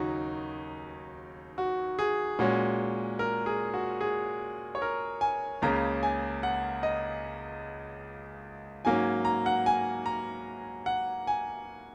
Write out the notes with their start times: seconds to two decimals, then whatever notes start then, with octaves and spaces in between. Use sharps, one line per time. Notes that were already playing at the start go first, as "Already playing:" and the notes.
Already playing: D#2 C#3 F#3 D#4 F#4
1.58 F#4
1.99 G#4
2.39 A#2 G#3 C#4 F#4
3.19 A#4
3.46 G#4
3.74 F#4
4.01 G#4
4.75 C#5
4.82 A#4
5.21 G#5
5.62 C#2 C#3 A#3 C#4 A#5
6.03 G#5
6.43 F#5
6.83 D#5
8.85 G#2 F#3 A#3 C#4 G#5
9.25 A#5
9.46 F#5
9.66 G#5
10.06 A#5
10.86 F#5
11.27 G#5